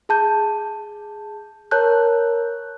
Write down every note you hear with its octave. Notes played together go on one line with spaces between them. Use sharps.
G#4 A5 G6
A#4 C#5 A5 F#6 G6